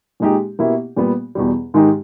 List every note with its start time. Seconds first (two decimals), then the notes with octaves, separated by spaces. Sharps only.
0.20 A#2 G#3 D#4 G4
0.59 B2 A#3 E4 G4
0.96 A#2 G3 B3
1.35 E2 B2 G3
1.74 G#2 D#3 G#3 D#4 G4